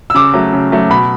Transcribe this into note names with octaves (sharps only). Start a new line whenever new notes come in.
E6
C#3 D6
F#3 A3
C#3
F#3 A3
B2 B5